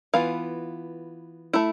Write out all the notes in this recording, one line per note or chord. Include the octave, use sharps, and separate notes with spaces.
E3 B3 F4 F5
A3 E4